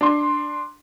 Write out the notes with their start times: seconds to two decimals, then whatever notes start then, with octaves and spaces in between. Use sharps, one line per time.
0.01 D4 C6